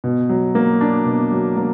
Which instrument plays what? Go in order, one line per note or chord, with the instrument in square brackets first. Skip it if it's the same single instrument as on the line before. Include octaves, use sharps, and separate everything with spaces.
[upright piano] B2
F#3
A#3
D4
B2
F#3
A#3